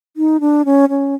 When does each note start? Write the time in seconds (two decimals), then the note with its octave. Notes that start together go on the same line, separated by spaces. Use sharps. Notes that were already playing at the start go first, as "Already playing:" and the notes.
0.17 D#4
0.40 D4
0.65 C#4
0.89 C#4